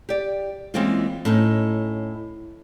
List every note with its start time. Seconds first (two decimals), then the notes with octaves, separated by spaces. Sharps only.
0.09 G4 D5
0.74 E3 G#3 A#3 C4 C#4 F4
1.25 A2 C#4 D#4